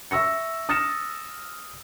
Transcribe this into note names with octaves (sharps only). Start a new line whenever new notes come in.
E5 C#6 E6 A#6 C#7
D#6 F6 A6 A#6 C#7 E7